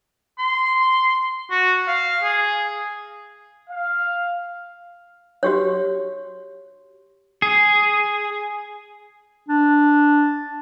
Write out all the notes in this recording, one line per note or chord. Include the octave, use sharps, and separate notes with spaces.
C6
F#4
F5
G#4
F5
F#4 G4 C#5
G#4
D4